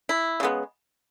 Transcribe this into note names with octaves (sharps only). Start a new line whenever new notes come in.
E4
C#3 G#3 B3